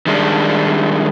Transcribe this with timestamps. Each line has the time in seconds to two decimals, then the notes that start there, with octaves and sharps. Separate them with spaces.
0.06 D#3 G3 G#3 D4